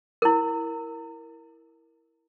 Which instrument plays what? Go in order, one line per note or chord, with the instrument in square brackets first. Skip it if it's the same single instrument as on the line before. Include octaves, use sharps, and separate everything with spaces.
[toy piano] E4 A#4